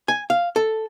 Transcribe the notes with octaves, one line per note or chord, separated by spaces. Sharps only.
G#5
F5
A4